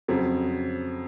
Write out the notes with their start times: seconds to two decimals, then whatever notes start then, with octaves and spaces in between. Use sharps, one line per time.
0.08 F2 C#3 F#3 C4